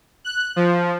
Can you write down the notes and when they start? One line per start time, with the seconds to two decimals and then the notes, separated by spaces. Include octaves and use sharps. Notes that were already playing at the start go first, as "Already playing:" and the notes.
0.25 F#6
0.56 F3